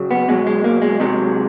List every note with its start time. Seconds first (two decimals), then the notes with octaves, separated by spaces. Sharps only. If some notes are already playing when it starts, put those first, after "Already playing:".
Already playing: C#3 F#3
0.11 B3
0.28 B2 F#3 G#3
0.47 G#3
0.64 A#3
0.82 G#3
1.00 C3 D#3 F#3 G#3